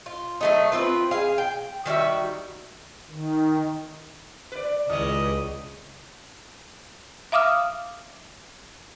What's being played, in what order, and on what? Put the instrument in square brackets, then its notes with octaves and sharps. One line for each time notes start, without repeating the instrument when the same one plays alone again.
[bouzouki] F4
F#3 A3 D#4
C4 F4 B4
G#4 F5
G5
D#3 G3 F#4 E5
[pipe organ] D#3
[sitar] B4 D5
[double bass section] C#2 [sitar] D#3 G3 C#5 [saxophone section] D#5
[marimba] E5 F5 D6 D#6 F6